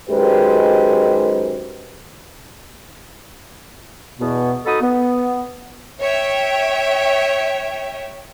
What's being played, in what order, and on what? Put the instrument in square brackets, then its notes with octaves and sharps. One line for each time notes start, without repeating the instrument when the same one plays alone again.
[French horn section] F#2 D#3 G#3 G4 B4 C5
[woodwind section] E2 B2 B3
D#4 F#4 A4 D#5 B5 D#6
B3
[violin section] C#5 E5 G5